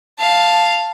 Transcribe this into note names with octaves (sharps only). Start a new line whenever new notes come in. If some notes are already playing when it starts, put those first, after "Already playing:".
F5 A5